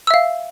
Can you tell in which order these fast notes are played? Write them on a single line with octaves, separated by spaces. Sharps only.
E6 E5 F5